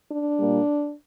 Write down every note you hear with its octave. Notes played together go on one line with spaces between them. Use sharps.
D4
A#2 G3 A#3